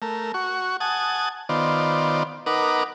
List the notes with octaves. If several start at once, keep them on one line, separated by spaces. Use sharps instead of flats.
A3 A#4
F#4 C#6
F#5 G#5 A5 D#6
D#3 B3 F4 C5 D5
D#4 A#4 B4 F#5 D6